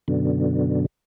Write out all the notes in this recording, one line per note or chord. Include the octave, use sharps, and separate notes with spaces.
F#2 B2 D3